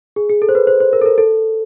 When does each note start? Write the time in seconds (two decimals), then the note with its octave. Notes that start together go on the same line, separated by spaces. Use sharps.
0.16 G#4
0.30 G#4
0.42 A4
0.49 C5
0.55 B4
0.67 C5
0.80 C5
0.93 A#4
1.02 A4
1.06 A#4
1.18 A4